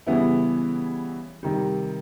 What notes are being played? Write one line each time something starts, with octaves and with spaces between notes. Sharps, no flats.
C#3 E3 G3 B3 E4
C3 D#3 G3